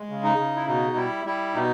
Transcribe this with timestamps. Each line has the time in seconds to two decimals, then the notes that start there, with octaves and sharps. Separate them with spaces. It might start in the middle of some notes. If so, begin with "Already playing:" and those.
Already playing: G#3
0.09 C#3
0.24 D#4
0.38 C#3
0.56 E4
0.66 B2 D#4
0.96 G3 E4
1.25 G3 E4
1.54 B2 D#4